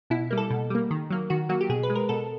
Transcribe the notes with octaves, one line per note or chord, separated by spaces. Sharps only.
B2 E4
G3 A#3
A4
B2
G3 A#3
D#3
F#3 A#3
D#3 F#4
F#3 A#3 F#4
G4
B2 G#4
B4
G#3
A#4
B2 A4